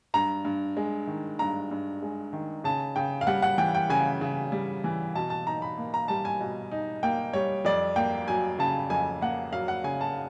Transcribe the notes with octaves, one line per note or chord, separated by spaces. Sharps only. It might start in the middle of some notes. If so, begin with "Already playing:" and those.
G2 A#5
G2
G#3
D#3
G2 A#5
G2
G#3
D#3
C#3 A5
C#3 G5
F5
G3 F#5
F#5
E3 G5
G5
C#3 G#5
C#3
G3
E3
B2 A5
A5
D#4 A#5
B5
A#3
A#5
G3 A5
G#5
B2
D#4
A#3 G5
G3 C#5
F2 D5
A#3 G5
F#3 G#5
C#3 A5
F2 G#5
A#3 F#5
F#3 F5
F#5
C#3 G#5
A5